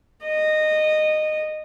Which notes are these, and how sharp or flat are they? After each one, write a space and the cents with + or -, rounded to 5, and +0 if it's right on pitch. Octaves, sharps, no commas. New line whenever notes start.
D#5 -15